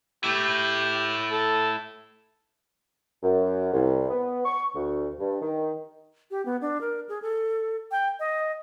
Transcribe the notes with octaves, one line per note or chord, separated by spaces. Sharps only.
A3 E4 G4
A4
F#2
C2
B3
C#6
D2
G2
D#3
G4
B3
D4
A#4
G#4
A4
G5
D#5